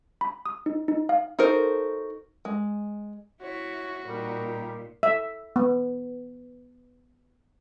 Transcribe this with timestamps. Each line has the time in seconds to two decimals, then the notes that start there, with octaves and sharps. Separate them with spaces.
0.21 B5
0.46 D#6
0.66 D#4
0.88 D#4
1.09 F5
1.39 D#4 F#4 A4 A#4 C5
2.45 G#3
3.42 E4 F#4 C#5
4.07 A#2 G3 D#4 A#4
5.03 E5
5.56 B3